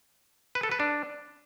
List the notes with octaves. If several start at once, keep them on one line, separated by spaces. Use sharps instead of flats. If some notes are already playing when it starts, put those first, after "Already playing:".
B4
A4
B4
D4